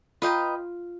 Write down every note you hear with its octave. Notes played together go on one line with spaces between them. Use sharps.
F4 B4 D#5 G5 A#5